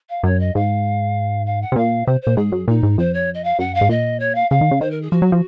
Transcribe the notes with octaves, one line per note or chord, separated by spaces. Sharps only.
F5
F#2 C#5
D#5
G#2 F5
F5
F#5
C3
A#2 F5
C3 C5
C5
A#2
G#2 G#4
F#2
A#2 D#4
G#2
F2 C5
C#5
D#5
F5
F#2 F#5
F5
G#2
A#2 D#5
C#5
F5
C#3 F5
D#3
C#3
D#3 C5
A#4
G#4
F3 F#4
F#3
F3